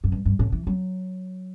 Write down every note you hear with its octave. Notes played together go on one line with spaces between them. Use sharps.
F#2
G2
G2
A2
E3
F#3